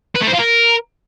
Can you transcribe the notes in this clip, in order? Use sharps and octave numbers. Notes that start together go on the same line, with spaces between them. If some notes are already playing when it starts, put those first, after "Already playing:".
B4
A3
C5
F4
A#4